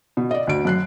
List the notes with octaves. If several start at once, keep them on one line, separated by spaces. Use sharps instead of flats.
B2
D5 D#5
D2 D7
F#2 F#6 C7